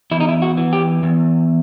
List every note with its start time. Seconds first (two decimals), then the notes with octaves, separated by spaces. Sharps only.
0.11 E2 E4
0.20 D#4
0.28 E4
0.42 F#4
0.57 E3
0.73 G4
1.03 E2